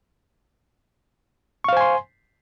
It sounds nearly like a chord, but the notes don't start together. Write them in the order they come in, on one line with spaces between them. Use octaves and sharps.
C#6 F5 C5 G#5 C6